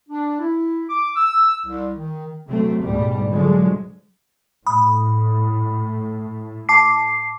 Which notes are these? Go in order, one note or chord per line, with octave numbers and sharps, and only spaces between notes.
D4
E4
D6
E6
C2
D#3
C3 F#3 A3 C4
D2 G#2 B2 G3
D3 F3 F#3 G#3
A2 B5 D#6
A5 D6 C7